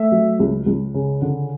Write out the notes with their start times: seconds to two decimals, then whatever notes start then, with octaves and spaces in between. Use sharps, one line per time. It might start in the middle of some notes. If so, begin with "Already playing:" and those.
Already playing: A3 E5
0.12 F#3
0.39 C#2
0.66 C#2
0.94 C#3
1.22 D3